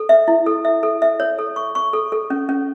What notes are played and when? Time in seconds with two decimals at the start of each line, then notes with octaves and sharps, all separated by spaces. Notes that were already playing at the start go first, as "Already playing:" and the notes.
Already playing: A4
0.09 E5
0.28 E4
0.46 A4
0.65 E5
0.83 A4
1.02 E5
1.20 C#5
1.39 A4
1.56 C#6
1.75 C#6
1.93 A4
2.12 A4
2.30 C#4
2.49 C#4